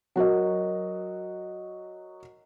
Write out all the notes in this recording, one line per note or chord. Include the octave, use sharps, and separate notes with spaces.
F#3 F#4 A#4 D#5